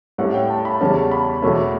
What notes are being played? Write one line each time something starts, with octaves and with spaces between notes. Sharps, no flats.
A2 G3 C#4 F#5
G5
A5
B5
E2 C#3 G3 C#4 A5
B5
E2 B2 A3 C#4